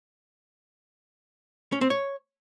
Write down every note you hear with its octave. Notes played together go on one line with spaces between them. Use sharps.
C#4
C4
C#5